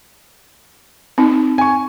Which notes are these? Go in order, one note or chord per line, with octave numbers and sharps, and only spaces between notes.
C4 D#4
G#5 C#6